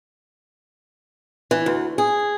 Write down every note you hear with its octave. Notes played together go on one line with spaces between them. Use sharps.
E3
D2
G#4